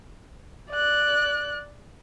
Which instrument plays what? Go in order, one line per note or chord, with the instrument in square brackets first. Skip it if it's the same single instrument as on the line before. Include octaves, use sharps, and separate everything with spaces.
[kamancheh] D5 F#6